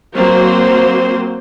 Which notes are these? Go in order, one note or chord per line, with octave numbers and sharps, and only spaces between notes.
F#3 A#3 C4 C5